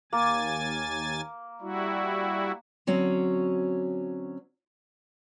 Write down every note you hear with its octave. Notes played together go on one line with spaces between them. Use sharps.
D#2 A#3 G#5 A6
G3 E4 F#4
D3 F#3 C4 C#4